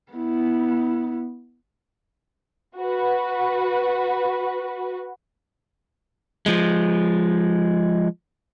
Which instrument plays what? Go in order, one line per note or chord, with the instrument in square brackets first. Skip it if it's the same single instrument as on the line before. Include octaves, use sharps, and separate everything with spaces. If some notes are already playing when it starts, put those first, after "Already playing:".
[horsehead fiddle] B3 E4
[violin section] F#4 B4
[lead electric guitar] F3 G#3